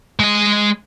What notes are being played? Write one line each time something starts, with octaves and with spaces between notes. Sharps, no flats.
G#3 D#5